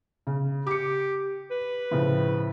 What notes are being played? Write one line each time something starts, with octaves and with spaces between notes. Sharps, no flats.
C#3
G4 D6 C#7
B4
A2 C#3 F3